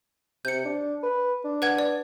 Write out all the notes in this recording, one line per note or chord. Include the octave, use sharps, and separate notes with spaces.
C3 G6 C#7
D4
B4
D4
B4 F#5 G#6
D5